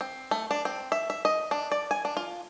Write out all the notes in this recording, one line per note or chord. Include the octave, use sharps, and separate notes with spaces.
C4
A3
D4
C4
E5
E5
D#5
D4
D5
G#5
D4
F4